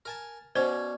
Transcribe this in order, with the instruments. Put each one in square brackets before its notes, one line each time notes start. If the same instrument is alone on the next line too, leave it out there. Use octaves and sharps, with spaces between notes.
[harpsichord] A#4 G#5 A5
[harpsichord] B2 C#4 [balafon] C5 [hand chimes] D5